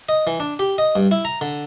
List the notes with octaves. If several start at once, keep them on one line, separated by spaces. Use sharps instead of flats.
D#5
E3
D4
G4
D#5
G2
E4
A#5
D3